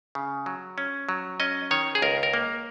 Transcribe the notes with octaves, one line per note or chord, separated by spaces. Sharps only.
C#3
F#3
C#4
F#3
C#4 D#5
D#3 C#5
G#4
C#2 A#4
A#4
A#3